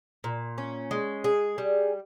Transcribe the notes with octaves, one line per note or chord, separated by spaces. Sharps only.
A#2
C#4
G#3
G#4
G3